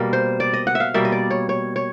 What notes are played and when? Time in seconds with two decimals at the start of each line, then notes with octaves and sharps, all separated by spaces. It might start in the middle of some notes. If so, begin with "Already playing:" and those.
Already playing: B2 G3 A#3 A#4
0.13 C5
0.40 D5
0.53 D#5
0.67 F#5
0.75 E5
0.80 F5
0.94 B2 G3 A#3 E5
1.05 D#5
1.12 D5
1.30 C#5
1.49 C#5
1.76 C#5